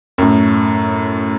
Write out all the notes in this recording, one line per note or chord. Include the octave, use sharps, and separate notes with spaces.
F#2 A2